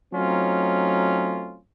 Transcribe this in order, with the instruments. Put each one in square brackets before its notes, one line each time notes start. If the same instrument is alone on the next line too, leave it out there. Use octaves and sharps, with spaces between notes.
[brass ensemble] F#3 A3 C4 C#4 D#4 F4